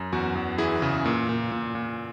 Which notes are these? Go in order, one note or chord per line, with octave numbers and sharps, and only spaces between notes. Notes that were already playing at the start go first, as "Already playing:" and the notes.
Already playing: F#2
E2 F#4
E2
E3 E4 G#4
C#3
A#2
A#2
A#2
A#2